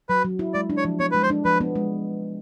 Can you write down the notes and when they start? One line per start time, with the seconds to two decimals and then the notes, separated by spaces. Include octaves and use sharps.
0.09 F#3 B4
0.24 F#3
0.39 E4
0.54 G#3 D5
0.70 D4
0.77 C#5
0.85 F3
1.00 B3 C#5
1.11 G#3 B4
1.23 C5
1.30 D4
1.45 F3 B4
1.61 B3
1.75 G#3